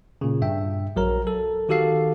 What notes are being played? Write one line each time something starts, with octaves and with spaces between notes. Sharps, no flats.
A#2 C#3
G2 E5 G5
A#1 F#3 A#4 A#5
A4
D#3 F#4 G4 A4 F5 C7